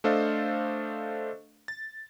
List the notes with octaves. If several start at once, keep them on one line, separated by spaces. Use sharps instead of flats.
A3 D4 A4 C5 D#5 F5
A6